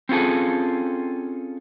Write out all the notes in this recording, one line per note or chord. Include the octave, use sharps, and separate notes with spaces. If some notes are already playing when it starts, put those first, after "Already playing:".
C4 C#4 F4 G#4 A4